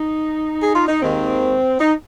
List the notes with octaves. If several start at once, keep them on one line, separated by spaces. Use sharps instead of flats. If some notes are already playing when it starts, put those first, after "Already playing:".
Already playing: D#4
G#4
F4
D#4
D#2 D#3 G#3 C4
D#4